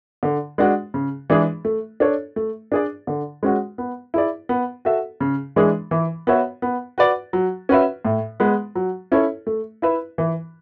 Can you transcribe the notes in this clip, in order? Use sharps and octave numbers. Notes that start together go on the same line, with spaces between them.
D3
G#3 D4 F#4
C#3
E3 G#3 D4 G#4
A3
D4 A4 C#5
A3
D4 G#4 D5
D3
G#3 C#4 F#4
B3
E4 G#4 D5
B3
F#4 A4 E5
C#3
E3 G#3 D4 G#4
E3
B3 F#4 C#5 E5
B3
F#4 B4 D5
F#3
C#4 F#4 B4 E5
A2
G#3 B3
F#3
C#4 E4 A4 C#5
A3
E4 B4 E5
E3